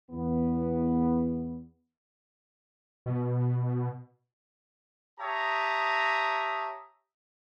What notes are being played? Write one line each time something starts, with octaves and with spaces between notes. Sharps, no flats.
E2 B3
B2
G4 C#5 E5 A5 A#5 D#6